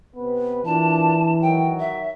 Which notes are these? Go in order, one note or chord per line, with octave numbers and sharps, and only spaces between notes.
C3 B3 B4
A#2 E3 D4 A5
D#3 F#3 G5
E5